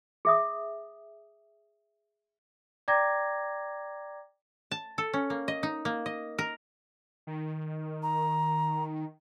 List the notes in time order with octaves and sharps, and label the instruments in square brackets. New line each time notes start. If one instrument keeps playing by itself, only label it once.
[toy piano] G#4 E5 D#6
[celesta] D5 G5 A#5 D6 G#6 A#6
[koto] A5
A4
C#4
A#3
D#5
D#4
A#3
D#5
A#4
[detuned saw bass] D#3
[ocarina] A#5